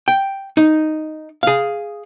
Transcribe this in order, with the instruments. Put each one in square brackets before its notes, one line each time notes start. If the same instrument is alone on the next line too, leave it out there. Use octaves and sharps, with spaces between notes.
[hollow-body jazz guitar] G5
D#4
G#4 F5